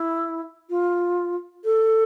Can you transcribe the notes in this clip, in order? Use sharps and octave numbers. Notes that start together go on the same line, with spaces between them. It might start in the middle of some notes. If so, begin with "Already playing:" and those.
Already playing: E4
F4
A4